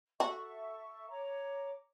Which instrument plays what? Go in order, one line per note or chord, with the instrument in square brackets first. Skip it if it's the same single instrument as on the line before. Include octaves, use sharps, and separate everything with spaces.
[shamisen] F#4 [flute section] A4 E5 C#6
[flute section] C#5 A#5 D6